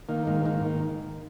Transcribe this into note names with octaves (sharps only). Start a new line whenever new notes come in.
D#3 A#3
G#2 A#3
D#3 A#3